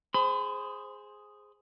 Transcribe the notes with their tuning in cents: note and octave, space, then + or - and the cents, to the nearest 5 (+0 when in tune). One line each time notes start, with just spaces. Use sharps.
G#4 +0 C5 +0 B5 +40